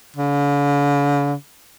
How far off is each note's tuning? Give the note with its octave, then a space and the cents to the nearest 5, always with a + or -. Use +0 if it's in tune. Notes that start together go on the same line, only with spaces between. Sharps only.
D3 -45